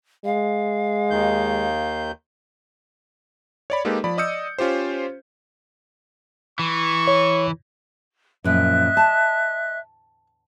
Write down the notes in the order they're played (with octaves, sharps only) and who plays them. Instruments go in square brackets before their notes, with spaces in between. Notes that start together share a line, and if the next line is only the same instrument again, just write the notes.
[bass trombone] G#3 [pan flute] F5
[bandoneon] D#2 D#3 G6
[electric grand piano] C#5 D5 B5
G#3 A#3 D#4 G4 A4 B4
F3 D5 B5
D5 D#5 D#6 E6 G6 C#7
C#4 F4 G4 C5
[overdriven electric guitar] E3 [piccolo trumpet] C#6
[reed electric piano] C#5
[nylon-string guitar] F#2 A#2 F3 [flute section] D#5 E5 F#6
[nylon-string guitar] A5